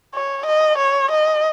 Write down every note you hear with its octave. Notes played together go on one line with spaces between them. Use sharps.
C#5
D#5
C#5
D#5